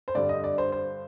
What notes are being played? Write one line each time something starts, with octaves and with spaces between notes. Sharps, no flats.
C5
G2 D3 G3 D5
D#5
D5
C5
C5